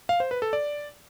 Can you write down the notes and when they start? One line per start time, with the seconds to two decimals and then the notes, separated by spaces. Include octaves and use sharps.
0.09 F5
0.20 C5
0.31 B4
0.42 A4
0.53 D5